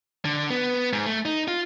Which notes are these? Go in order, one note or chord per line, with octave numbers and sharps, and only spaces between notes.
D3
B3
G#2
A3
D#4
F4